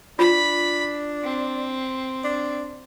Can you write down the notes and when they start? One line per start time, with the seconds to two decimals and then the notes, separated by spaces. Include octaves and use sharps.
0.19 D4 F4 B5
1.23 C4
2.24 D4